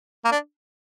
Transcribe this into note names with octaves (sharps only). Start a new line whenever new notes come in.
A#3
D4